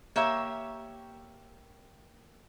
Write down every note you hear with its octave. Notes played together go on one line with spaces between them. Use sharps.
A#3 G4 C#5 E5